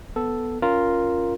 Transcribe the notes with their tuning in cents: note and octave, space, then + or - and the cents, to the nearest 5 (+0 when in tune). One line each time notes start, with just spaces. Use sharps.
B3 +0 A4 +0
C#4 +5 F4 +0 A#4 +0